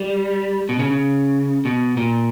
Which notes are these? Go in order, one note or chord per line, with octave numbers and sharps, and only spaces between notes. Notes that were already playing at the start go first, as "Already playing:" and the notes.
Already playing: G3
B2
C#3
C#3
B2
A#2